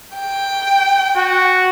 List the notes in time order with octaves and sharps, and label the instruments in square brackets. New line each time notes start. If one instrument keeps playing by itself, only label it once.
[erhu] G5
[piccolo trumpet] F#4